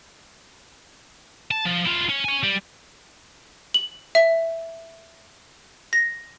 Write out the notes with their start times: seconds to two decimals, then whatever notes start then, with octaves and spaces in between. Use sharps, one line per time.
1.51 A5
1.66 F3
1.86 E4 F4
2.10 C#4
2.24 C#5 G#5
2.43 G3
3.74 F#7
4.15 E5
5.93 A#6